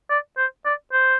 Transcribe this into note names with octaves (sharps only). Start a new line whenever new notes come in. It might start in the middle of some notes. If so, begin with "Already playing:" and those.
D5
C5
D5
C5